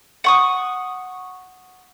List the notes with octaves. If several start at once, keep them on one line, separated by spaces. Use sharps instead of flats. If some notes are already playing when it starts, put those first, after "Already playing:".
F#5 C#6 D#6